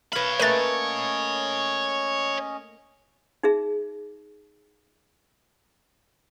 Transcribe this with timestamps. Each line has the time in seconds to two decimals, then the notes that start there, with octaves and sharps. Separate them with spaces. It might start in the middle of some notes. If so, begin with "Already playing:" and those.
0.13 B4 C#5 F5 B5
0.39 A3 A#3 C#4 B4 D#5 A6
3.43 D#4 G#4 E5